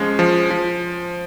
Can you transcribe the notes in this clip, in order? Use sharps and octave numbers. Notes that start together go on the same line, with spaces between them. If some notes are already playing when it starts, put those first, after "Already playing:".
Already playing: F3 G#3 C#4
F3
F3